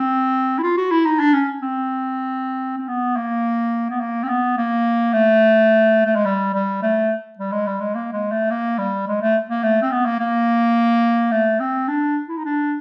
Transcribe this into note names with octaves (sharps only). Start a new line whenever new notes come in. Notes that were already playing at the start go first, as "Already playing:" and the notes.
Already playing: C4
E4
F4
F#4
E4
D#4
D4
C#4
C4
C4
B3
A#3
B3
A#3
C4
B3
A#3
A3
A3
G#3
G3
G3
A3
G3
G#3
G3
G#3
A#3
G#3
A3
A#3
G3
G#3
A3
A#3
A3
C4
B3
A#3
A#3
A3
C4
D4
E4
D#4
D4